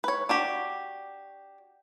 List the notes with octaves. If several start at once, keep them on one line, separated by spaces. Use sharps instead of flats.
B4 C#5
D4 F#4 G4